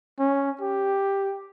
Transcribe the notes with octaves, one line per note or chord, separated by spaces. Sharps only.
C#4
G4